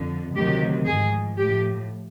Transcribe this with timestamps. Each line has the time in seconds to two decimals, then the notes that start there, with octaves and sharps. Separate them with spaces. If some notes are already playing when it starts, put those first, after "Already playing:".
Already playing: F2 D3 F3
0.35 D2 C3 D#3 F#3 G4
0.86 G#2 F3 G#4
1.37 A2 F3 G4